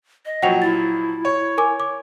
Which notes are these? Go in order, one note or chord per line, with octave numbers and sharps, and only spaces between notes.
D#5
A#2 F3 F#3 F#5 G5 F7
E4 A6
C#5
A#4 G#5 D6
D6